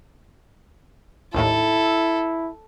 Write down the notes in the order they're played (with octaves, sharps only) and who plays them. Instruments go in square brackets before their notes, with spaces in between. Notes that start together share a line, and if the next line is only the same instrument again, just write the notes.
[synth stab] A#1 D#2 A2 [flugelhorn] E4 [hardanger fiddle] A4